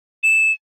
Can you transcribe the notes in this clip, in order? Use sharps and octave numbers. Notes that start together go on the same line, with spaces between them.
E7